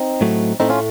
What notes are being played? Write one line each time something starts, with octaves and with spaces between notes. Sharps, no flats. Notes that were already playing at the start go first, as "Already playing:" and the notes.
Already playing: C4 D#4
A2 F#3 A3
A2 A3 C4 D#4
C#4 F4